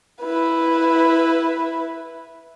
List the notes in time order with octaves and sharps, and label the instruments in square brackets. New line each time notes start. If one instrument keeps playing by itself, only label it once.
[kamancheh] E4 B4